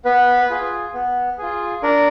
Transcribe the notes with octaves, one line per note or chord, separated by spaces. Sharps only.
B3 B4
F4 G#4
B3
F4 G#4
D4 A#4